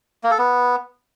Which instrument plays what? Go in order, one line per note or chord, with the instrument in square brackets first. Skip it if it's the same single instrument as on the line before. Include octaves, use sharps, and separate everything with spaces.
[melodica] A#3
A4
B3